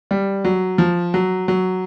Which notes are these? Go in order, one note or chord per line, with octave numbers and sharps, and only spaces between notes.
G3
F#3
F3
F#3
F#3